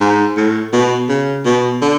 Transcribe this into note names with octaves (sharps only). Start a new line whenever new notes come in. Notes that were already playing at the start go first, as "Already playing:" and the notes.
G#2
A2
B2
C#3
B2
D3